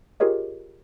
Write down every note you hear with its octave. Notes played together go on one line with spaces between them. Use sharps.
F4 G4 G#4 A#4 C#5 D#5